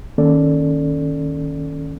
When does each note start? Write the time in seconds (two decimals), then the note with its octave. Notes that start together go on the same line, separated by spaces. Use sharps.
0.18 D#3 A#3 C#4 A4 D5